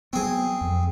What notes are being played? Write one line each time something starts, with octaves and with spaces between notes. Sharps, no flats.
F#3 B3 C4 G#4
F2